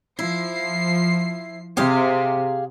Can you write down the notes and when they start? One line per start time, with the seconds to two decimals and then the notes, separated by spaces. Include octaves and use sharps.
0.19 F3 E4 C7
1.77 C3 G4 G#4 F5